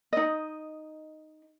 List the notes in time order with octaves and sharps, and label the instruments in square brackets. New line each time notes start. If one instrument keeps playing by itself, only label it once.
[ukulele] D#4 D#5